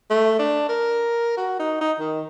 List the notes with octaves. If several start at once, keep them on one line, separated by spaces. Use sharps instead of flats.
A3
D4
A#4
F#4
D#4
D#4
D#3